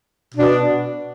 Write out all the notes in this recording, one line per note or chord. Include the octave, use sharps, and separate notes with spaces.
B2 B3 D4